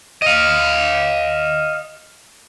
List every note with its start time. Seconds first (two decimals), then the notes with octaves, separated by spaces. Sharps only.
0.22 D#5 F5